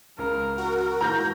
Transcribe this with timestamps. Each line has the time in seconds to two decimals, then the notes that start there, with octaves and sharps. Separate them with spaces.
0.19 C#2 A#4
0.58 F#4
1.01 G#2 E3 A#3 A#5 G6 A#6